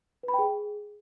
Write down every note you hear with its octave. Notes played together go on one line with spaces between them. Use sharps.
B4
B5
G5
G#4